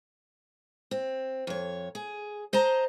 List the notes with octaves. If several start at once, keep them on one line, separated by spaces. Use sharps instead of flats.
C4
F2 C#5
G#4
C5 D#5 A5 A#5